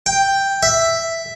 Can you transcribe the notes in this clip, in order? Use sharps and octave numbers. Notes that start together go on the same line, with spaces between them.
G5
E5